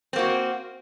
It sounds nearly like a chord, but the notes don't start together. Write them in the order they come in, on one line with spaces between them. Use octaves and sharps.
C4 A#3 F#4